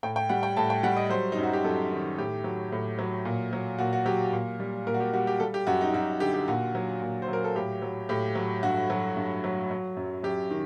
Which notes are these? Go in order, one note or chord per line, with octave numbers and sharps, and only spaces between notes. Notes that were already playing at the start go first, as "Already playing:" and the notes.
A2 G5
G5
G3 F#5
G5
A2 A5
G5
G3 F#5
D#5
F#3 C5
D#4
F#2
F#4
G4
F#2 A4
D#3
A2 G4
F#3
A2
F#3
A#2
F#3
A#2 F#4
F#4
F#3 G4
A#2
G3
A#2 A#4
F#4
G4
G3 F#4
G4
G3 A4
G4
F#2 F#4
D#4
F#2 F#4
D3 G4
G4
A#2 F#4
F#3
A#2
C5
F#3 A#4
A4
A2 G4
F#3
A2 G4
F#3
G2 F#4
F#3
G2
F#3
F#3
F#2
F#2 G4
D#3